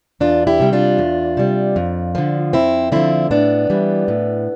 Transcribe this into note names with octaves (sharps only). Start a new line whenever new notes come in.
E2 D4 F4
E4 G4
C3 G3
D4 F4
E2
C3 G3
F2
D3 F3
F2 C4 E4
D3 F3 C4 E4
A2 B3 D4
E3 G3
A2